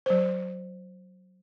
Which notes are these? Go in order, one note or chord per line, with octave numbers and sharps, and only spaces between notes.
F#3 C5